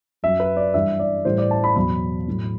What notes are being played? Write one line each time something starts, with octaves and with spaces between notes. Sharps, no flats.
F#2 F#3 E5
B4
D5
G2 E3 G3 E5
D5
A2 E3 G3 C5
D5
A5
B5
E2 B2 F#3 B5
A2 F#3